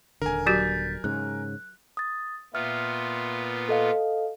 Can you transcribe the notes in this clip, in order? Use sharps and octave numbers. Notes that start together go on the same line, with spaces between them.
D#1 G#1 D3 A#4 G#5
F#3 F#4 G4 G6 A6 B6
G#2 C#3 F#6
D#6 A6
A#2 B3 F4 E5 F6
A4 D#5 F5